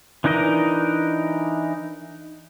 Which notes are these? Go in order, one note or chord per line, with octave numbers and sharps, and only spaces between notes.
E3 D4 D#4 A#4 D#5